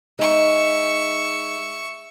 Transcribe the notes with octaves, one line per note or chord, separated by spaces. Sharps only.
G#3 D#4 E5 C#6